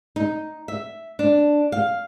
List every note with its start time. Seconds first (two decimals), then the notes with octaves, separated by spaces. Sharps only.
0.16 D#4
0.68 E5
1.19 D4
1.72 F5